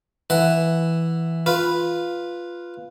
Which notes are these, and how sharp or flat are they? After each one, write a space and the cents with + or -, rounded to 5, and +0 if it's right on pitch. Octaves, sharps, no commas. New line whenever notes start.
E3 +0 F#5 +0
F4 +0 B4 +0